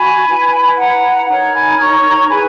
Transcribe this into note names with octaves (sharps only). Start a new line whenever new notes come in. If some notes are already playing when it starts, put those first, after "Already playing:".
Already playing: F#4 G#5 B5
E4 B4
F#5 A#5
D#4 A#4 C#5 F#5 A#5
G#5 B5
A#5 C#6
E4 G#4 B4 G#5 B5